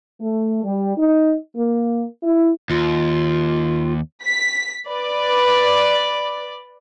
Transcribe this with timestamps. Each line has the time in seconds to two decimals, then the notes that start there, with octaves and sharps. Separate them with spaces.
0.21 A3
0.64 G3
0.97 D#4
1.56 A#3
2.23 E4
2.70 D#2 F4
4.25 B6
4.89 B4 D5